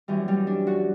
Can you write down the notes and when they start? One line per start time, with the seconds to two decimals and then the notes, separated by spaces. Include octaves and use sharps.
0.08 F#2 E3 G3
0.28 G3
0.47 D4
0.67 F#4